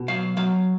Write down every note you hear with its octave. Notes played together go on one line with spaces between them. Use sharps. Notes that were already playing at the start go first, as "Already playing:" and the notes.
Already playing: B2
F#3 F5
F#3 F5